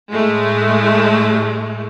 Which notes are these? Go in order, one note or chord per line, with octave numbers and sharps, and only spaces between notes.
A2 G#3 A3